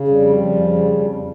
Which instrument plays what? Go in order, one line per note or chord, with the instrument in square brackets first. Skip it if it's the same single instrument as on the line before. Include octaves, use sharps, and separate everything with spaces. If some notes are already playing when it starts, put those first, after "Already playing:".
Already playing: [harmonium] C#3
F2 G3
F3
C#3
F2
F2